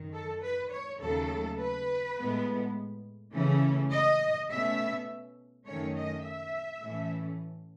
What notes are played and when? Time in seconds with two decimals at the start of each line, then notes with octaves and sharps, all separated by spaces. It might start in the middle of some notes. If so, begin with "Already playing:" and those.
Already playing: F#2 D#3
0.13 A4
0.42 B4
0.71 C#5
1.00 D#2 C#3 F#3 A3 A4
1.59 B4
2.18 A2 G#3 B3
3.33 C#3 E3 A3 C#4
3.92 D#5
4.50 B2 A3 C#4 E5
5.66 F#2 D#3 A3 C#4 C#5
5.96 D#5
6.24 E5
6.83 A2 E3 A3 C#4